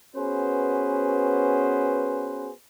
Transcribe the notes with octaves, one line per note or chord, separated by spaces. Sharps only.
B3 C#4 F#4 G#4 B4 C5